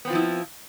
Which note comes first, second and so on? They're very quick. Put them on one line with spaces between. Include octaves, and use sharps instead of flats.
B3 C4 F4 F3 E4